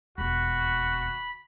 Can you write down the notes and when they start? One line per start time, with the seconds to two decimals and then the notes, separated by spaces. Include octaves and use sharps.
0.18 E1 D#2 F#4 B5